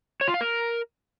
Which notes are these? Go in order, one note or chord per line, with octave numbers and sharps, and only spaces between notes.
C#5
F4
F5
A#4